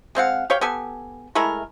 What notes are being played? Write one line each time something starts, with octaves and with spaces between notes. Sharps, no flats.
G#3 C4 F5 F#5
G4 C#5 F5 G5
B3 G4 A4 G#5
G#3 A3 E4 A#4